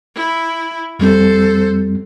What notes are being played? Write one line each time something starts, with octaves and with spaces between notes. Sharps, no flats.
E4
F2 G3 C4 A4 C5